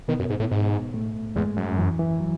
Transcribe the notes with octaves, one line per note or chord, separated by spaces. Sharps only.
B2 D#3 B3
F#2
G#2
A2
G#2
A2 A3
E2 G#2 G#3
F#2
E3
E3
F#3